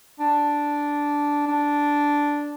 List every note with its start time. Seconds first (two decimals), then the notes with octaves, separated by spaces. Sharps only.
0.20 D4
1.47 D4